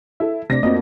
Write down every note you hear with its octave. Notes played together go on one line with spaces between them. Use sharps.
E4 A4 E5
C3 A3 D4 D5 A#6
F2 F3 A#3 F#4 D#5